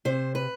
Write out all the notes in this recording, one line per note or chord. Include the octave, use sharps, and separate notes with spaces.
C3 C5
B4